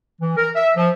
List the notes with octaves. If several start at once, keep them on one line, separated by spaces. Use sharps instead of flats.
E3
A#4
E5
F3